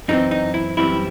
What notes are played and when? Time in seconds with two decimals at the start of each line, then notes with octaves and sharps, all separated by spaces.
0.08 F#2 E3 G3 C4 D#4
0.31 D#4
0.54 E4
0.77 F#2 E3 G3 C4 E4